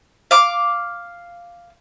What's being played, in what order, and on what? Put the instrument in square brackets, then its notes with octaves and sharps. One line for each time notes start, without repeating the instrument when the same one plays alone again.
[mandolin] F5 D6